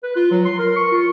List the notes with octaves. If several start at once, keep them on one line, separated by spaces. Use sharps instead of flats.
B4
F4
F#3
C6
A#4
C#6
F4